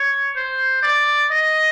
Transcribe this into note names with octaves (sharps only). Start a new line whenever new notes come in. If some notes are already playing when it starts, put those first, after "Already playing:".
Already playing: C#5
C5
D5
D#5